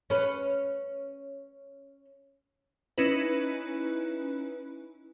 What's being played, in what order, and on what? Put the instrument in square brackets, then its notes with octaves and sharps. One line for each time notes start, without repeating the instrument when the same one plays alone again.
[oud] C#4 B4
[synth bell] C#4 D#4 E4 B4